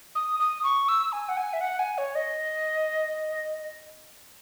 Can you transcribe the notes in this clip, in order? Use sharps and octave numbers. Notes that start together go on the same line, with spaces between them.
D#6
D#6
C#6
E6
G#5
F#5
G#5
E5
F#5
G#5
C#5
D#5